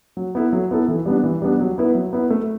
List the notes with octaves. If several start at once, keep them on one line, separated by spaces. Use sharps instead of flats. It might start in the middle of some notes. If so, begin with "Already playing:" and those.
F#3
B3 E4 A4
F#3
B3 E4 A4
E3
G3 B3 D4
E3
G3 B3 D4
F#3
B3 E4 B4
F#3
B3 E4 B4
A3